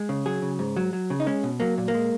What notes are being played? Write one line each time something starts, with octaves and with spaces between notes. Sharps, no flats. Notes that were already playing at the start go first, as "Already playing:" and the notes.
Already playing: G#3
C#3
F#3 G#4
C#3
G#2
F#3
F#3
C#3
D#4
G#3 C#4
B2
F#3 A#3
A#2
A#3
G#3